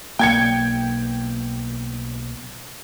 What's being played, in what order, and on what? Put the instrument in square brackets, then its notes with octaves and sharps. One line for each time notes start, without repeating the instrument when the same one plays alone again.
[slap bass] B1 A#3 [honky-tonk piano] G5 G#6 C#7